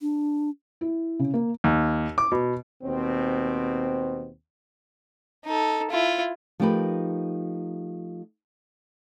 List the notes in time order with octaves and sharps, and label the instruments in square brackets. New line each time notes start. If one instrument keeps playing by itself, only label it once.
[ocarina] D4
[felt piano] E4
C#3
A#3
[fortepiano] D#2
D6
B2
[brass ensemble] D#2 B2 C4
[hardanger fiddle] D#4 A4
E4 F4
[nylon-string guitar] F3 A3 D#4 G4 A#4 B4